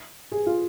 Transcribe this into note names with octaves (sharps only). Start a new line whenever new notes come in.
G#4
F4